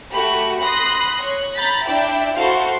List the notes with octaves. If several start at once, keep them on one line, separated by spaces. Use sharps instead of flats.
A3 F#4 G4 B5
B5 C6 D#6 F#6 A#6
C#5 F#6
A#5 B5 G6 A6 B6
D4 E4 D5 E5 G5
E4 F#4 A4 C5 F5 C6